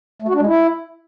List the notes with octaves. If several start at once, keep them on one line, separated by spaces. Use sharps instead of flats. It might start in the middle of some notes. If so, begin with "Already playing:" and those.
A3
F#4
D4
G#3
E4